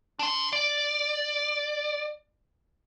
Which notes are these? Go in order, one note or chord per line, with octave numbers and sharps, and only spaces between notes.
D4 C6
D5